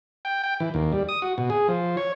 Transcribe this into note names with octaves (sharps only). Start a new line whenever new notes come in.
G5
G5
E3
D#2
G3
D#6
F#4
B2
G#4
F3
C#5